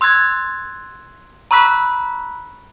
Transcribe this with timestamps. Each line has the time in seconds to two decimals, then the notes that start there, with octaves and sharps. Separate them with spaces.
0.01 C6 E6 F#6 G#6 A6
1.51 A#5 B5 C#6 E6 F#6 B6